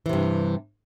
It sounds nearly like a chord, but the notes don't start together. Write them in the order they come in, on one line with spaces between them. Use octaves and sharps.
E3 C3 G2